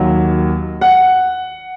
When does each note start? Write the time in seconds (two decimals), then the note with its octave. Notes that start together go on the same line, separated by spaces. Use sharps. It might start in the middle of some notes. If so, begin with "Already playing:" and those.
Already playing: D#2 D#3 F#3
0.81 F#5